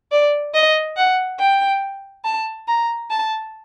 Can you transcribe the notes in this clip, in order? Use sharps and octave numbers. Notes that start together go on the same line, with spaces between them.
D5
D#5
F#5
G5
A5
A#5
A5